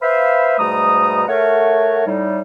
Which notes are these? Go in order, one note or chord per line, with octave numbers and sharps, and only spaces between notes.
B4 C5 E5 F5
G#2 B2 G3 A3 A#5 D#6
A3 A#4 C#5 F#5
A2 G3 D#4